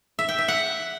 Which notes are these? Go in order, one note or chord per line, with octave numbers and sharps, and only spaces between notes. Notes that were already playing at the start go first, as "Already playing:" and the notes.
E5
G5
E5
F#5